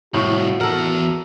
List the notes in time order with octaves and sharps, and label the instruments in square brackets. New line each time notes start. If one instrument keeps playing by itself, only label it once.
[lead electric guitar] C2 F3 [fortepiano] A2 C#6 [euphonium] F#4
[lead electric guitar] E2 F#5 [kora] A4 A#4